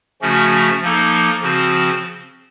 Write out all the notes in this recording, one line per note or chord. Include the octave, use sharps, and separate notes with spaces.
C#3 F3 A3 C#4 F#4
F3 A#3 D#4 A4
C#3 F3 C4 F#4 C5